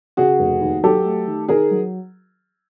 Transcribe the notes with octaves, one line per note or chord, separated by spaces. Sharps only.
C#3 F#4 G#4
F1
D#2
F#3 G4 A4
A3
D#3
D#3 G#4 A#4
F#3